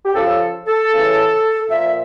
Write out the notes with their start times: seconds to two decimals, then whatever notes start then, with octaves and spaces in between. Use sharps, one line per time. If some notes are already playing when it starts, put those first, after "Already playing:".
0.05 G4
0.14 C#3 F3 A4
0.67 A4
0.92 C#3 E3
1.70 A#2 F3 E5